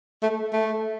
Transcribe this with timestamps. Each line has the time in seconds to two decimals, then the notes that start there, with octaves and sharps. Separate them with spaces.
0.23 A3
0.53 A3